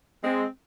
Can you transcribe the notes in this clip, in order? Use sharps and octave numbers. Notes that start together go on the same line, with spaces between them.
G#3 C4